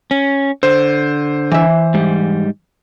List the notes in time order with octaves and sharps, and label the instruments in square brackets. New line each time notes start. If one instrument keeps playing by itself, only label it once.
[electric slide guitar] C#4
[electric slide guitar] D3 [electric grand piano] C5
[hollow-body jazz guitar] E3 E5
[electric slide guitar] G#2 G3